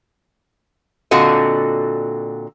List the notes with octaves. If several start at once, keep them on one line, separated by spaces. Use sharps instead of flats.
A#2 D3 C4 F#4 A4 D#5